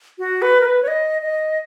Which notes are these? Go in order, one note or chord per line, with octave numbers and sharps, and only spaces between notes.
F#4
B4
A#4
B4
C#5
D#5
D#5